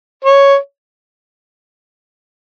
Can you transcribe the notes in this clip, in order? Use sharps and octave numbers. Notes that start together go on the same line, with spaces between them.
C#5